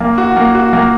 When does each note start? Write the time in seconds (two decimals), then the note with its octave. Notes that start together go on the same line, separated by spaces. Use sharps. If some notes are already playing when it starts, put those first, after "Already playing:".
0.01 A#3
0.18 F#4
0.37 A#3
0.55 F#4
0.73 A#3